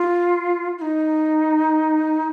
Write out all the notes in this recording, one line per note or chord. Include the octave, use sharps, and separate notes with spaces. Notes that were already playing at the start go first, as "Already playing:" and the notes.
Already playing: F4
F4
D#4